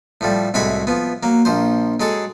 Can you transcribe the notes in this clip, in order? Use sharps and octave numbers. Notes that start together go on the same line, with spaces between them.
A2 F3 G3
C2 A2 G#3 F#4 C#5 B5
F3 B3
F#3 A#3
A#1 F3 C5
F#3 G#3 G#4 A4